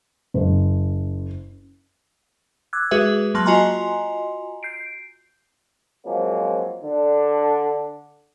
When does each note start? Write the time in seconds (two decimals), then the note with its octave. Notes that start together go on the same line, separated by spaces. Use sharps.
0.34 F#1
2.73 D6 E6 F#6 G#6
2.91 G#3 F#4 G#4 B4 E5
3.34 F#3 A#3 A5 C6 F#6 F#7
3.46 F4 F#4 D#5 G#5 A#5 C6
4.63 G6 C7 D7
6.05 F3 F#3 G#3 A#3 C4 C#4
6.83 D3 D4